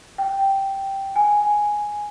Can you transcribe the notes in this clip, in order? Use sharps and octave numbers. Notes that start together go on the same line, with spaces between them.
G5
G#5